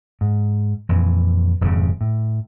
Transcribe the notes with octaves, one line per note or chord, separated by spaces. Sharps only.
G#2
F2 A#2 E3
D#1 F2 G#2 C#3
A2